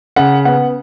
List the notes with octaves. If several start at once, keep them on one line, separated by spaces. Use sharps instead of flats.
C#3 F#5
B3 F#5